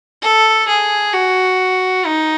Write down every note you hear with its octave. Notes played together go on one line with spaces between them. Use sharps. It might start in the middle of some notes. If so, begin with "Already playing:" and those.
A4
G#4
F#4
D#4